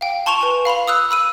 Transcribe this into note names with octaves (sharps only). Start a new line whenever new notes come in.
F5 G5
A5 C6 C#6 E7 F7
B4 G#5
F5 B5 C6 F7
D#6 E6 F#6
B5 E6 D#7